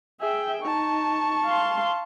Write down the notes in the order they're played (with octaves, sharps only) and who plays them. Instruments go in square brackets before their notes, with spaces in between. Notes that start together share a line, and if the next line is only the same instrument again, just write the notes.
[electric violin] G#4 [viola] E5 G5
[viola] D#4 [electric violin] A5 C#6
[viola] F5 C6